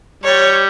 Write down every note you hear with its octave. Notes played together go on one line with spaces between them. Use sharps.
G3 C#5